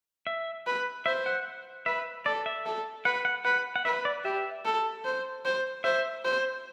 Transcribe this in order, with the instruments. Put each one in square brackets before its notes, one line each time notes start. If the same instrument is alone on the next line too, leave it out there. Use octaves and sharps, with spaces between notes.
[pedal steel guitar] E5
[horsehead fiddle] B4
[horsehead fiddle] C5 [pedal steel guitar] E5
[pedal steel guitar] F#5
[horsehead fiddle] B4 [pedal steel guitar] E5
[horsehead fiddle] A4 [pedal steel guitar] D5
[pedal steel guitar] E5
[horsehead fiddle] A4
[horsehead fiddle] B4 [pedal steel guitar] F#5
[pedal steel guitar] F#5
[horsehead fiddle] B4 [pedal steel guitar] F#5
[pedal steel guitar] F#5
[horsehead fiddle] B4 [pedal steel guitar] E5
[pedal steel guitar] D5
[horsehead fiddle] G4 [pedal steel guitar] E5
[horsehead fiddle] A4
C5
C5
[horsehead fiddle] C5 [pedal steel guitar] E5
[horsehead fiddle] C5